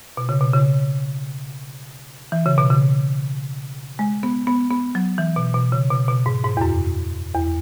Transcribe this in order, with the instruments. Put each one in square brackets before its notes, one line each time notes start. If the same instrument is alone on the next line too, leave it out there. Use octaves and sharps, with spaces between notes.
[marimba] B2
C#3
B2
C#3
E3
C#3
B2
C#3
G#3
B3
B3
B3
F#3
E3
B2
B2
C#3
B2
B2
G#2
G#2
E2
F#2
E2